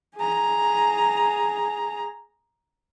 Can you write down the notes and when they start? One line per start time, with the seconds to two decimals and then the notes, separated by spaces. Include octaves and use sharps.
0.16 G#4 A#5